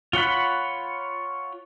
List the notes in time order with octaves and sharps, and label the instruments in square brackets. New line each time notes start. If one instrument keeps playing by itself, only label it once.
[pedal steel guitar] F4 C#5 F#5 B5